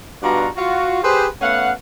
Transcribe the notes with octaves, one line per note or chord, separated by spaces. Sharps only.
G2 B2 D4 F4 F#4 A#5
F4 F#4
G4 G#4 B4 C5
A3 B3 C#4 F5 F#5